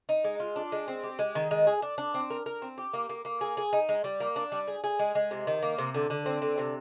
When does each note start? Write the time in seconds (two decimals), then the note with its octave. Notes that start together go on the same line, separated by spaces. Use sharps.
0.09 D#4
0.24 G#3
0.40 F4
0.56 D4
0.72 G#3
0.88 C4
1.03 G4
1.19 G#3
1.35 D#3
1.51 G#3
1.67 G#4
1.82 D4
1.98 D4
2.14 C4
2.30 A#4
2.46 A#4
2.62 C4
2.78 G4
2.94 A#3
3.09 A#3
3.25 A#3
3.41 G#4
3.57 G#4
3.73 D#4
3.89 G#3
4.04 G3
4.20 A#3
4.36 D4
4.52 G3
4.68 G#4
4.84 G#4
4.99 G#3
5.15 G#3
5.31 C3
5.47 D#3
5.63 A#3
5.78 C3
5.94 D3
6.10 D3
6.26 C4
6.42 D3
6.58 C3